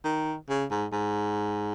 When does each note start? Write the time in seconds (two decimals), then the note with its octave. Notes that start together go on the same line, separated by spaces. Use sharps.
0.04 D#3
0.49 C#3
0.71 G#2
0.92 G#2